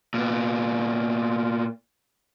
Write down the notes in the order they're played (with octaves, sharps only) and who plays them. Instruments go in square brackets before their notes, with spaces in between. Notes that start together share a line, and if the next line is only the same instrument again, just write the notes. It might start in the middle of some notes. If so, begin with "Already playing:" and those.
[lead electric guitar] A#2 B3